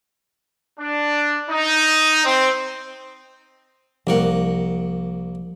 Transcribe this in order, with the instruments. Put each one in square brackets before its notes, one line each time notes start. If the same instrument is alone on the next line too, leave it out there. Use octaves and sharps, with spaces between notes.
[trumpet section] D4
D#4
C4
[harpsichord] C2 A#3 F#5 [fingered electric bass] F3